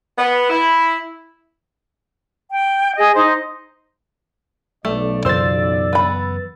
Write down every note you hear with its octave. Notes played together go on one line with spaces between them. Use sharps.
B3
E4
G5
G#4 D#5
D#4 C5 D#5
B1 A3 D5
F#2 C#3 E3 F4 C5 E6 A6
B3 B5